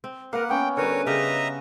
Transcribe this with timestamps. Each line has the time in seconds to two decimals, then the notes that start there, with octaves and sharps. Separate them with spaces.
0.04 C4
0.33 A#3 A#4 B4 F5 F#5
0.49 B3 C#4 G5
0.77 D3 G3 A#4 B4 C#5
1.07 C#3 G4 A#4 D#5 E5 A#5